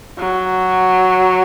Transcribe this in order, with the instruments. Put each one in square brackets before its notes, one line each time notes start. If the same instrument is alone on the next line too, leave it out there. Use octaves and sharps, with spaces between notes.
[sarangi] F#3